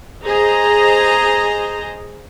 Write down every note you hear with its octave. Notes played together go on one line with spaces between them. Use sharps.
G#4 C5 D#5 A#5